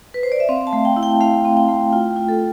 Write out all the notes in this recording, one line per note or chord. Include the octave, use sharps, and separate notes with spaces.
B4
C5
D5
E5
C4 F5
A5
A3
G5
E4
G5
A3 F5
C4
G5
A3
F4 G5
F4
A4